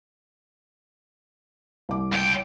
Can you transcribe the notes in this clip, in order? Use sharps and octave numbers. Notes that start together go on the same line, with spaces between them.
C2 D6
C#2 G5